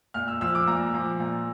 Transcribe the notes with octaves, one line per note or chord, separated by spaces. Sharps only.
A#2 F6
E6
F3 E6
D6
A#2 A#5
F3
A#2